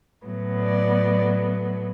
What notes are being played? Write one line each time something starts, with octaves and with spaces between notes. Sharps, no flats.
A2 F#3 B3
D5